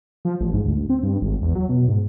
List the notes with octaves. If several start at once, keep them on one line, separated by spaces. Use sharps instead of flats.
F3
A1
G#2
D2
C4
G2
G#1
E2
F#3
B2
G#2